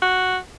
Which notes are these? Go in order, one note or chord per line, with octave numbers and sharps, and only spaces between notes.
F#4